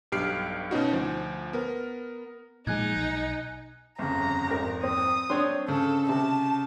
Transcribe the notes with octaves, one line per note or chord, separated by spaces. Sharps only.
B1 G2 G4 F6 C7 D7
B2 C#4 D#4 F#4
D2 F3
B3 A#4
A#2 F3 G#3 D#4 G#5 F#6 G#6
B1
G1 F2 C#3 A#5
G#1 F2 A#4
C4 D#6
C4 D4 C5 C#5 C6
C#3 A4
C3 A5